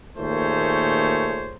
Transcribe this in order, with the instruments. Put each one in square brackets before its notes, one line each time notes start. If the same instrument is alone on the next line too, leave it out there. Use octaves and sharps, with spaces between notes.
[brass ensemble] D#2 A#2 A3 G#4 C5 C#5